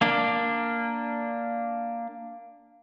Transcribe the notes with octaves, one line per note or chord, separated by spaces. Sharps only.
A#3 D4